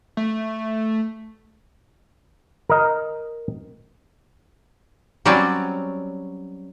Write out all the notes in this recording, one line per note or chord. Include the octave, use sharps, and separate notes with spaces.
A3
A#4 D#5
F#3 G3 C4 C#4 F#4 D5